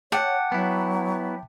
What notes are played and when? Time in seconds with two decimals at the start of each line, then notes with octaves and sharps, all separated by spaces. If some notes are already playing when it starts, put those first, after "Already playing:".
0.12 C#5 F#5 G5 A5 D6
0.52 F#3 B3 E4